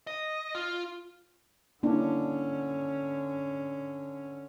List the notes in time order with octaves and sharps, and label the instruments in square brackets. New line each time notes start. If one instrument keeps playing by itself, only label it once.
[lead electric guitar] D#5
F4
[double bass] D3 C#4 [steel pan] A#3 D4 E4